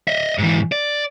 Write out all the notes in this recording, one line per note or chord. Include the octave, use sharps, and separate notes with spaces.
D#5 E5
G#2 E3
D5